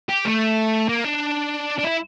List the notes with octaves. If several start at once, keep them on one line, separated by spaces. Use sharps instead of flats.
G4
A3
A#3
D4
D4
E4